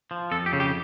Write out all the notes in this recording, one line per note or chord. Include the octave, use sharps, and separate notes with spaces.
F3
F2 A4
G4
C#3
G4